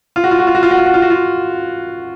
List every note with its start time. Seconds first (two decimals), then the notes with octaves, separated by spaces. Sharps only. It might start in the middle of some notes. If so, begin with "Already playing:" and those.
0.16 F4
0.24 F#4
0.31 F4
0.39 F#4
0.47 F4
0.55 F#4
0.63 F4
0.71 F#4
0.78 F4
0.86 F#4
0.94 F4
1.02 F#4
1.10 F4